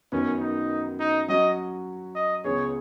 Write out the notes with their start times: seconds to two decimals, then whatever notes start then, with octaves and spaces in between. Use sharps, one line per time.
0.12 F#2 D#3 B3 C#4
0.41 D#4
1.00 D#4
1.28 F#3 C#4 F#4 D#5
2.15 D#5
2.44 C#2 C#3 B3 G#4 C#5